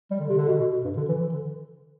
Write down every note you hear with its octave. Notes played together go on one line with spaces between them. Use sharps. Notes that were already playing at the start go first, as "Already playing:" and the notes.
G3
D3
C3
D3
B2
B2
B2
G2
D3
E3
E3
D3